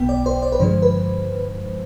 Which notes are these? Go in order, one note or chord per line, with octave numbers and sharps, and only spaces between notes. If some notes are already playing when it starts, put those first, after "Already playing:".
Already playing: B1 B2 B3 G5
D5
C5
D5
B4
G2 D3 F3 G#3 C5
B4